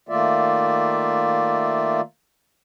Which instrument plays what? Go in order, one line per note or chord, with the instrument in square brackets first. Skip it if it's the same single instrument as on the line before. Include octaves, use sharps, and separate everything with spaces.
[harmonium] D#3 A3 A#3 F4 D5 E5